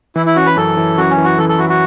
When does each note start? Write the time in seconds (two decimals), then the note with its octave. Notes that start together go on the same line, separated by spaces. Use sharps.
0.16 E3 E4
0.26 E4
0.36 C#4 F#4
0.46 B4
0.56 F#2 A4
0.77 E3
0.98 F#2 F#4
1.11 C#4
1.18 E3
1.24 F#4
1.38 E3 A4
1.49 A4
1.58 E4 F#4
1.69 F#4